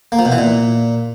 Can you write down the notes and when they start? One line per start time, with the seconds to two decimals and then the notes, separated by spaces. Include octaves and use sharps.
0.12 A#3
0.19 F3
0.25 B2
0.32 E3
0.38 A#2